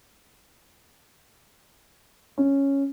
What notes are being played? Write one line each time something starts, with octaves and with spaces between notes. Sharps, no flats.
C#4